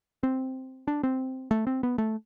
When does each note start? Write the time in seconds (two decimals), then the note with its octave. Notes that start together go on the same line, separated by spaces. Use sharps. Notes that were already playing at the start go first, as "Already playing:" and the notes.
0.23 C4
0.88 D4
1.03 C4
1.51 A3
1.67 C4
1.83 B3
1.98 A3